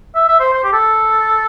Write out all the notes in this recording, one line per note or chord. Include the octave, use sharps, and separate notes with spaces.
E5
E5
C5
C5
G4
A4